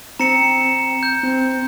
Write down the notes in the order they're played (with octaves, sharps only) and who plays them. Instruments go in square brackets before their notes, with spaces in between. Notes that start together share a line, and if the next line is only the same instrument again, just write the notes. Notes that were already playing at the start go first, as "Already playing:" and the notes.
[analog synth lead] C4 [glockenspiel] A#5 C#7 E7
[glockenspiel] G6
[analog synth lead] C4